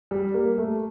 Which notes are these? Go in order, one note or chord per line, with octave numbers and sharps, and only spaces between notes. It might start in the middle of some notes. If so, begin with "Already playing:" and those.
G3
A#3
A3